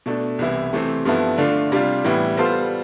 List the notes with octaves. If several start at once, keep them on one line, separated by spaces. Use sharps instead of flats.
B2 A3 D4 A4
C2 C3 E3 B3 E4
C3 E3 A3 C4
G2 F3 B3 E4 A4
D3 A3 D4 F4
C3 G3 D4 F4
A2 E3 G3 B3 E4
G3 B3 F4 A4 C5